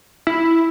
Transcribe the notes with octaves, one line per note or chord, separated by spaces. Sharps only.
E4